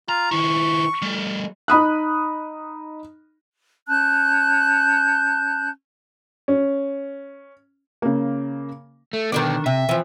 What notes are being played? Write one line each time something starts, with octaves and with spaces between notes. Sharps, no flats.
F4 A#5
D#3 E4 C#6
G3 A3
D#4 B5 D#6 F#6
C#4 A5 F#6 G6
C#4
C#3 A#3
A3
B2 D3 D#3 B3 D4 D5
C3 E5
E3 F3